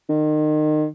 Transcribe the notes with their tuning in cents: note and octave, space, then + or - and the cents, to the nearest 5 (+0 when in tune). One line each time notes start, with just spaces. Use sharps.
D#3 -30